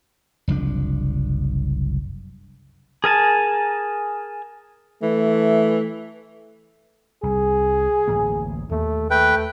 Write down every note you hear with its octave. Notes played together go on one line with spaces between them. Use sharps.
F#1 C2 F3 D4
G#4 A#4 G#5 A5
E3 A3
C2 G#4
D1 A1 A#3
D#2 A3 A#3
A3 B4 G5